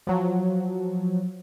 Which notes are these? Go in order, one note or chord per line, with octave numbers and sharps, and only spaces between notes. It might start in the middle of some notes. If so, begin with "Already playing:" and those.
F3 F#3